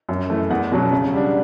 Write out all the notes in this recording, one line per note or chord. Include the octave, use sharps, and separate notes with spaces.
F#2
E3 A3 E4
E2 F#5
B2 F#3 C#4
C#3
G3 D4